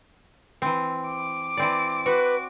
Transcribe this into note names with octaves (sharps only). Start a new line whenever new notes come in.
E3 C4
D6
E3 C4 D5
F#4 B4